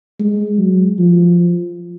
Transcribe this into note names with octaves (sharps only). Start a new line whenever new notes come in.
G#3
F#3
F3